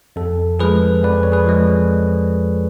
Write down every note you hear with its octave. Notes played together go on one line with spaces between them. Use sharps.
F2 A4
F3 G#3 G#4 B4
F2 B4 D5
C#5
G#4 B4
F3 G#3